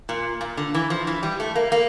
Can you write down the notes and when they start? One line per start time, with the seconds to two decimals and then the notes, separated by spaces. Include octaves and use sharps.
0.09 A#2
0.41 A#2
0.57 D3
0.74 E3
0.90 F3
1.07 E3
1.23 G3
1.40 A3
1.55 A#3
1.72 A#3